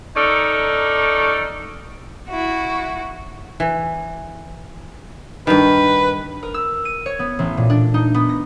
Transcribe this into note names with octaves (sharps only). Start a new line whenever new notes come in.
C#4 D#4 A4 A#4 D5
E4 F#4
E3
G2 D#3 B4
A#4
E6
D#7
C#5
B3
A1
A#2
D4
D#4
B3
A#6